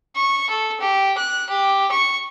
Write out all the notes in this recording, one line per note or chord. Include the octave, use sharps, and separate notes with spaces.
C#6
A4
G4
F#6
G4
C#6